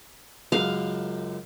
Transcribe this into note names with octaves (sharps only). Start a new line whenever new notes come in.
C#2 F#2 F5